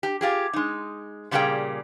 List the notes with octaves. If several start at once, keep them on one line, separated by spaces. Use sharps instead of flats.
G4
F4 G4 G#4
G#3 D#4
A#2 C#3 G3 A#3 G#4 G5